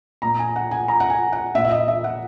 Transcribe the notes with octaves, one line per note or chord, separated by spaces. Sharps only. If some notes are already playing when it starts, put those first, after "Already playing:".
A#2 A#5
G#5
F#5
G#5
A#5
F#5
G#5
F#5
A#2 E5
E5
D#5
E5
F#5